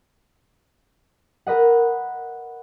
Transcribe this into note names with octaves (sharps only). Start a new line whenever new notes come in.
A#4 B4 D#5 F#5